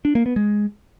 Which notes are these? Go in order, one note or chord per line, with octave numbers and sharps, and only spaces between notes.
D4
A#3
B3
G#3